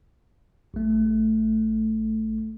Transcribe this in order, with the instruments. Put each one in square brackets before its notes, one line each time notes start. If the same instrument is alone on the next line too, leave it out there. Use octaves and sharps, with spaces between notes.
[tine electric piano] A1 A3